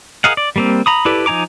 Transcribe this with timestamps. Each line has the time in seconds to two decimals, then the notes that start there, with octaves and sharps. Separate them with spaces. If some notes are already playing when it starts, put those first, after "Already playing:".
0.24 G#4 A#4 D#5 F5 F#5
0.37 D5
0.56 G3 A#3 C4
0.86 A#5 B5 D#6
1.05 E4 G4 A4 B4 D5
1.26 F3 D#4 G#5 A#5 D6